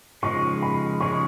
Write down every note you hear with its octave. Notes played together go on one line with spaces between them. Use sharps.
C#3 F3 G#3 D#4 G#4 C#6
B5
C#3 F3 G#3 D#4 G#4 C#6